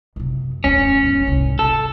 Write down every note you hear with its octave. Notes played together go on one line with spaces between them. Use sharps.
F#2 C3
D1 F2 C#4
G1
C2 G#2
C2 A4